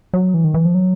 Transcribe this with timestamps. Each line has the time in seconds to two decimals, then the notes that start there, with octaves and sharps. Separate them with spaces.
0.14 F#3
0.34 E3
0.44 D#3
0.54 E3
0.65 F3
0.75 F#3